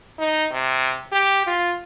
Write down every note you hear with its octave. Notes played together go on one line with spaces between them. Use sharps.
D#4
C3
G4
F4